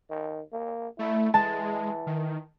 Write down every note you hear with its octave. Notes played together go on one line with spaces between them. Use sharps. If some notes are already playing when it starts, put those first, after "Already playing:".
D#3
A#3
A3 E4
E3 G#3 A5
D#3